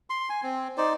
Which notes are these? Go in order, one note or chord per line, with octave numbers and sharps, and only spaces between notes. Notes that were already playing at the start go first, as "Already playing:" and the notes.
C6
G#5
C4
D#4 C5 D5